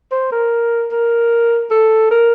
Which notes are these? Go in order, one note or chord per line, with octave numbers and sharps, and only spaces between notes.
C5
A#4
A#4
A4
A#4